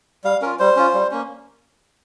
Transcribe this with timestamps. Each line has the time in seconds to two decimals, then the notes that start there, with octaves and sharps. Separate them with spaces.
0.24 G3 F5
0.42 C#4 F4 A#4
0.59 G3 C5
0.76 C#4 F4
0.94 G3
1.11 A#3 C#4